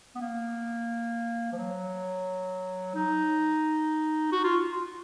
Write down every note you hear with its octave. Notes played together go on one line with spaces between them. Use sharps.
B3
A#3
F3
F#3
D#4
F#4
F4